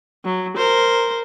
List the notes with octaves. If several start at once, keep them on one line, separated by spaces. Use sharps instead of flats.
F#3
A#4 C5